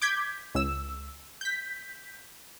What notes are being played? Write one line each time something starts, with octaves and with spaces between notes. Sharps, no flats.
D6 G6 G#6 B6
C#2 E6
G6 B6